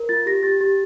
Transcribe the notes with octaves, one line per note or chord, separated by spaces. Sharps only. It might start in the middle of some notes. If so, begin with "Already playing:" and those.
Already playing: A#4
F4 A6
G4 A#6
G4 A6
G4 A6